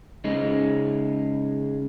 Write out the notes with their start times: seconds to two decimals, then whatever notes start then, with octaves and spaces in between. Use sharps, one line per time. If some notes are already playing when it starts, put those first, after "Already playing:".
0.24 C#3 G#3 D#4